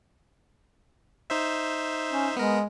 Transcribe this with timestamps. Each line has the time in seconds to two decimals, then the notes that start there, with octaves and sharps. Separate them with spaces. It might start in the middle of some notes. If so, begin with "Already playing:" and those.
1.30 D#4 C5 E5
2.12 C#4
2.37 G#3 B3 A#4